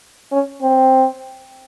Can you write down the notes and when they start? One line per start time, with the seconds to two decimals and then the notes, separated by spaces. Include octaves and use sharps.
0.32 C#4
0.62 C4